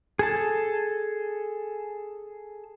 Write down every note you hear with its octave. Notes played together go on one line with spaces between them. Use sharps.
G#4 A4 A5